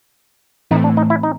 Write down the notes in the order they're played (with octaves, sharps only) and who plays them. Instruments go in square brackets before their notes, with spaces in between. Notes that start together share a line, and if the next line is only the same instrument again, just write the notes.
[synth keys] A2 E3 A3 C4 [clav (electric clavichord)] D#4
[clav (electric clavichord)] D4
D#4
E4
D#4